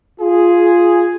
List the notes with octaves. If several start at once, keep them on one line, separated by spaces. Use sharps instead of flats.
F4 G#4